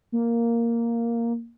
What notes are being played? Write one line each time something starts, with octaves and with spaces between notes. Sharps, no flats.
A#3